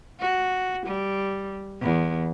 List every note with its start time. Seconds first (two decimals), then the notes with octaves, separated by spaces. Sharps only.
0.20 F#4
0.86 G3
1.81 E2